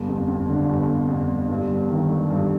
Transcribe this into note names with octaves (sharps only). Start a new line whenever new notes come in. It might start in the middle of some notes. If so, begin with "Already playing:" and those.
Already playing: G1
F2
F2
D3
G1
G1
F2
G1
G2
G1
D#3
A3
G2